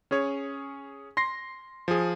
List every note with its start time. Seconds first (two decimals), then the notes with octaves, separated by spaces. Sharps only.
0.11 C#4 G#4 C#5
1.17 C6 A#6 C7
1.88 F3 G#4